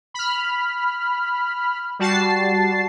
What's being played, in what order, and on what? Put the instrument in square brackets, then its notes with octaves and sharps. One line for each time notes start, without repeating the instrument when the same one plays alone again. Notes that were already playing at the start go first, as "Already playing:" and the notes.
[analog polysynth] B5 F6
G3 F#4 A5 A6 C7